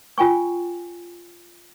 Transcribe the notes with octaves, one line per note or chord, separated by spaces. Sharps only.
F4 G5 G#5 C#6